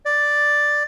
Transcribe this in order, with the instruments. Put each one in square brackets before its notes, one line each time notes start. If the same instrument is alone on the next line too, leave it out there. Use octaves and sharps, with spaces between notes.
[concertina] D5